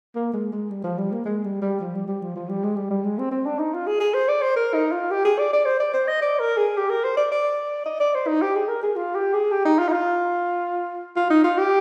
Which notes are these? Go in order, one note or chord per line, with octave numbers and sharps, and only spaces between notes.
A#3
G#3
G#3
G3
F3
G3
A#3
G#3
G3
G3
F3
G3
G3
F3
F3
G3
G#3
G3
G3
G#3
C4
C4
D4
D#4
F4
G#4
G#4
C5
D5
C5
A#4
D#4
F4
G4
G#4
D5
D5
C5
D5
C5
D#5
D5
A#4
G#4
G4
A#4
C5
D5
D5
D#5
D5
C5
D#4
G4
G#4
A#4
G#4
F4
G4
G#4
G4
D#4
F4
D#4
F4
F4
D#4
F4
G4